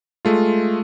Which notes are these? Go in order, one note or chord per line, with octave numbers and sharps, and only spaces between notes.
G#3 A3 F4